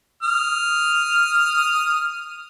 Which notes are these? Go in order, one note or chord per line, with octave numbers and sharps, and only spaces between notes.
D#6 F6